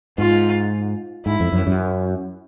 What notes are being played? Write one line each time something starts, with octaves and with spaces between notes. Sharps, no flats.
G#2 F4
G#2 E4
F2
F#2
F#2